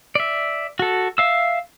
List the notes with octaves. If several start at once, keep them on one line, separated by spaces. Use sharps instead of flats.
D5 E5
F#4 A4
E5 F5 E6